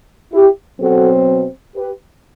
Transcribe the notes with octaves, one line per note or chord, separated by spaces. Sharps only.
E4 G4
B2 F#3 C4 F#4 A4
G4 B4